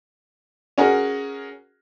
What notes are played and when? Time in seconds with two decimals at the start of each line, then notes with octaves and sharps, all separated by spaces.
0.78 C#4 F#4 G#4 A#4